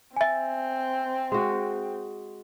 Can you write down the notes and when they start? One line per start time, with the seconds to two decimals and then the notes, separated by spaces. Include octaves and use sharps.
0.16 C4 E5 G#5
1.32 G#3 F#4